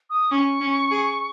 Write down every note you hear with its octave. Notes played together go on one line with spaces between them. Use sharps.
D#6
C#4 C#6
C#4
G#4